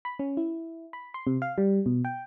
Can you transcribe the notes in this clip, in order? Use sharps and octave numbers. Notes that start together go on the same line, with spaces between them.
B5
C#4
E4
B5
C6
C3
F5
G3
B2
G5